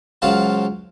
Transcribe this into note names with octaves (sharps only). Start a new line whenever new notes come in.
C#2 F3 F#3 F5 A5